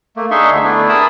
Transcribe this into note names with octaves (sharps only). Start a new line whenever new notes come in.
A3 A#3
D4 D#4 G#4 E5 C6 C#6
D2 D3
A3 B3 D4 E4
G#4 A#4 A5 B5 D#6